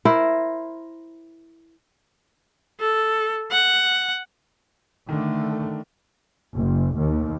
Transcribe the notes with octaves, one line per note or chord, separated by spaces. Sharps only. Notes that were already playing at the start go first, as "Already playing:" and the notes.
E4 A#4 C5
A4
F#5
D3 D#3 A3 D4
F#1
D#2